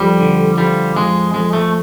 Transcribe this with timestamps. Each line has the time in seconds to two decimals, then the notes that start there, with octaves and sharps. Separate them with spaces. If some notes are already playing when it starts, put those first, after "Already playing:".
Already playing: F2 G3
0.20 D3
0.58 F3 G3
0.96 F2 G#3
1.34 F2 G#3
1.53 A3